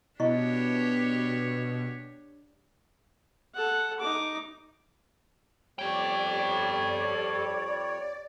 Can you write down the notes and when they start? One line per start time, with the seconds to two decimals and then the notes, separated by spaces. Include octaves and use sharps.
0.20 B2 D4 E4 G4 C#5 D#5 C#6
3.54 A4 F#5
4.00 D#4 D6
5.79 F2 G3 G4 A4 C#5 D5 G5